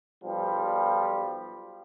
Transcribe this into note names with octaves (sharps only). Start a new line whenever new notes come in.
B1 F3 G3